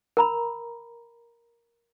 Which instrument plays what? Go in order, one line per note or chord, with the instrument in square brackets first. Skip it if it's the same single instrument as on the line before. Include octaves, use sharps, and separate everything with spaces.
[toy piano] A#4 A#5 B5